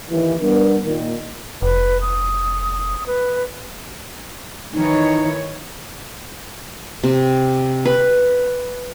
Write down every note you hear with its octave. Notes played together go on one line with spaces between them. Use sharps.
D#2 E3
G3 B3 D4 A#4
A#2 D#3
F1 B4
D#6
B4
D#3 E3 D#4 C#5
C3
B4